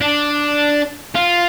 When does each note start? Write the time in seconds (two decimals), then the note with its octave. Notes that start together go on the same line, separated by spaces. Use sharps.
0.01 D4
1.15 F4